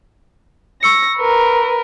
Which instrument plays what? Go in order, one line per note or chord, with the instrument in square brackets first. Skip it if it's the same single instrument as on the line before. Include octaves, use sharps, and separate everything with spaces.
[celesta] C#6 E6 C#7 [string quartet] A#6
[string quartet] A#4 B4